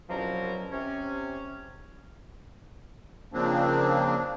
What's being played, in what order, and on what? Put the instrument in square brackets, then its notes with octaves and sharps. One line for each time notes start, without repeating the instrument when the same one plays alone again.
[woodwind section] C2 B2 F3 F#3 C#4 A#4
C3 C#4
[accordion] C#3 F3 A#3 C4 D4